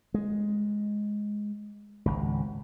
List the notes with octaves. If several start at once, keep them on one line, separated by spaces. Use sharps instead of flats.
G#3
G#1 C#2